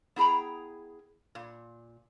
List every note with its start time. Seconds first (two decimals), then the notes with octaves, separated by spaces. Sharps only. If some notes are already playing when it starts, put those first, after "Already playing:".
0.16 B3 E4 G#4 G5 A#5
1.35 A#2